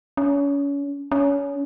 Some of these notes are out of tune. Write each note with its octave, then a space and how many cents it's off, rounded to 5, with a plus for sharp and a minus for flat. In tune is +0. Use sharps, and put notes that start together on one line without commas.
C#4 +30
C#4 +25